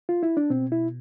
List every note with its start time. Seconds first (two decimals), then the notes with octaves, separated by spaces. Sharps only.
0.09 F4
0.23 E4
0.37 D4
0.50 B2 C4
0.72 E4